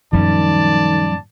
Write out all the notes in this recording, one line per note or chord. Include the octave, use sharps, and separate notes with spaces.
F#2 A#2 D#3 F3 G3 C#4 D5 A5